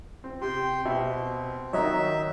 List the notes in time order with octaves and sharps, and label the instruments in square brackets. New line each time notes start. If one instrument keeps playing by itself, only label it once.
[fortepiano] C4
[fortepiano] C3 [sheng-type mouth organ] G5 C6
[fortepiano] B2 E5 [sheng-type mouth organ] C4
[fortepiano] D#3 F#3 [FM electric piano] C#5 D#5 A#5 [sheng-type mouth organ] E5